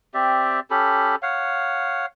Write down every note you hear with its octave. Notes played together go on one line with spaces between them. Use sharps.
C4 G4 D5 E5
C#4 G4 A4 B5
C#5 F5 F#5